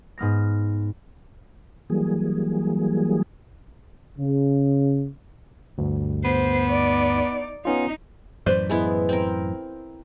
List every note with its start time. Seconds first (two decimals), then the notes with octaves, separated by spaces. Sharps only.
0.18 G#2 B3 F6 A#6
1.90 E3 F#3 G3 A#3 G#4
4.18 C#3
5.78 D2 G2
6.25 B3 C5
6.69 D#4 D5
7.65 B3 C#4 D#4 F4
8.46 F#2 A2 E3 B4 C5 D5
8.70 G#3 B3 E4
9.09 C4 A#4